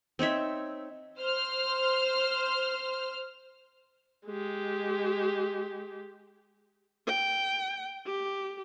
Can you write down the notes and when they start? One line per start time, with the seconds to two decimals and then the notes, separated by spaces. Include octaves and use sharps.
0.19 C4 D#4 C#5 E5
1.19 C5 F6
4.26 G#3 G4
7.07 G5
8.06 G4